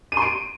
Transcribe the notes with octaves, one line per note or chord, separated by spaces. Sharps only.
D#7
C6
D7